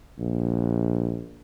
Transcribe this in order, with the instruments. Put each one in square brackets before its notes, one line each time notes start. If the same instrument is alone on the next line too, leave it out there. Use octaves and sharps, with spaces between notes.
[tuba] A#1